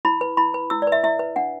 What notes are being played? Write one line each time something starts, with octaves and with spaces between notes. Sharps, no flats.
E4 B5
B4
E4 B5
B4
E4 E6
D5
B4
E5
E4 E5
B4
D4 F#5